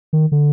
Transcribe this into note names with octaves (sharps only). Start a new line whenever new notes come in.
D#3
D3